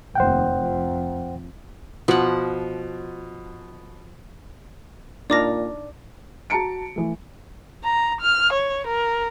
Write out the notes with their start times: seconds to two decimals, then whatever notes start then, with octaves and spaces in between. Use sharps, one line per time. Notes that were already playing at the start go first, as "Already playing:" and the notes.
0.15 F1 D#2 C5 F#5 G5
0.57 F2
2.08 B2 F3 F#5
5.30 A#2 D4 D#4 A#4 D5 D6 A#6
6.50 F#4 A5 A#5 C#7 D7
6.96 E3 A3
7.84 A#5
8.21 F6
8.53 C#5
8.87 A#4